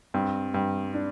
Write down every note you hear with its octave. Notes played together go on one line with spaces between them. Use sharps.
G2 C4
G2
D4